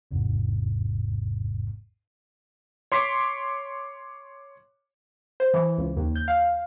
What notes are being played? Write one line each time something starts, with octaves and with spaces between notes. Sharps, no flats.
G#1 E2 G#2 C3
C#5 C6 D6 B6
C5
E3
C#2
D#2
G6
F5